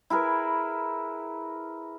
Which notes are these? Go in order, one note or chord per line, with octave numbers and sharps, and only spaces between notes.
E4 G#4 A#4 B4